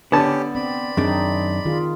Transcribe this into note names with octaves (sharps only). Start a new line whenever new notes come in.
D3 B3 C#4 G4 A5
C4 D5 B5
F#2 D#3 C4 D4 D#4 G#4
D#3 F4 G#4